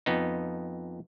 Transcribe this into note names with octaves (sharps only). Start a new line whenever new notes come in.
F2 B3 D#4